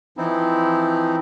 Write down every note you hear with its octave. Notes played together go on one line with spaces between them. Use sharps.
E3 F3 C4 D#4 E4